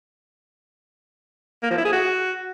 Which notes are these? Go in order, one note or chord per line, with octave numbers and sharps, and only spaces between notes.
A#3
F3
E4
G#4
F#4